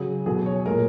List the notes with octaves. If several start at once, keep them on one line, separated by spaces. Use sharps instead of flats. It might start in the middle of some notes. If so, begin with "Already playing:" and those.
Already playing: C#3 F#3 G#4
B2 F#3 G#4
C#5
A#2 G#3 A#4